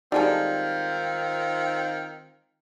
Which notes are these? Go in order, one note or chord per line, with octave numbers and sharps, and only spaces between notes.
D#3 G3 G#3 C4 D#4 F4 A4